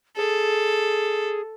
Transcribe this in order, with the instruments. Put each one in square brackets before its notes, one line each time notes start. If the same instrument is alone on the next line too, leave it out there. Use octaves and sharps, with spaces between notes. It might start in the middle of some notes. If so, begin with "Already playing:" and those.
[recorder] G#4 [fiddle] A4